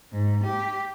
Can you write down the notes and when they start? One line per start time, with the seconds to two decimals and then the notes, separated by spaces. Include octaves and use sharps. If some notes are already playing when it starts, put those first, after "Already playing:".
0.12 G#2
0.44 G4